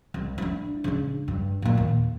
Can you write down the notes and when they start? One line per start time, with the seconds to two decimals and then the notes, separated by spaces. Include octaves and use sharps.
0.14 C2
0.38 D4 E4
0.84 C#3 D4
1.28 G2
1.62 A#2 A#3
1.77 D#2